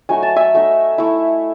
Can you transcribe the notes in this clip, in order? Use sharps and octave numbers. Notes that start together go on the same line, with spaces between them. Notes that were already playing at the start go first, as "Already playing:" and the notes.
F#3 A3 D#4 G#5
A5
E5 G#5
F#3 A3 D#4
A3 E4